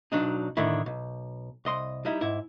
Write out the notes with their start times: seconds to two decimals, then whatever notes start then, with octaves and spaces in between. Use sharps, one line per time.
0.12 B1 F#3 D4 D#4
0.57 A2 D3 D#3 E4
0.86 B1
1.65 C2 D#5 C6
2.05 G3 D#4 E4
2.21 G#2 E4